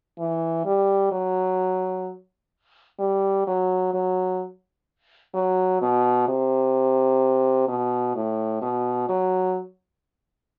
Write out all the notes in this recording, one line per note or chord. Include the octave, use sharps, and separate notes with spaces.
E3
G3
F#3
G3
F#3
F#3
F#3
B2
C3
B2
A2
B2
F#3